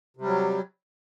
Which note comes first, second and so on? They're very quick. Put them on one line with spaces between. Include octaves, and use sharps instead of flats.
C3 G3 F#3